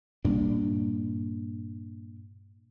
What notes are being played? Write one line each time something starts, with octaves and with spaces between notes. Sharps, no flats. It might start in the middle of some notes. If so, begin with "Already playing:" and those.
G2 A#2 D4